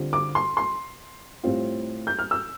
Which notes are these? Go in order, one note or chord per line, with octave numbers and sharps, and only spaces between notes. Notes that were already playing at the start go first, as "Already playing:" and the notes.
Already playing: D3 G3 C4 F4
D6
C6
C6
A2 G3 C4 F4
G6
F6
E6